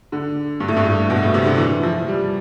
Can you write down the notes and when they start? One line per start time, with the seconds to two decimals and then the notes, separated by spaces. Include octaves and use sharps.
0.12 D3
0.60 G2
0.68 A2
0.76 G2
0.85 A2
1.10 B2
1.22 A2
1.34 C3
1.46 D3
1.58 E3
1.83 F3
2.08 G3